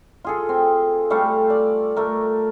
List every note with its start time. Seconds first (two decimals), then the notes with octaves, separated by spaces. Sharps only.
0.24 F4 G#4 A4
0.49 C4
1.10 G3 A3 F5 C#6
1.50 D5
1.97 A3 A#4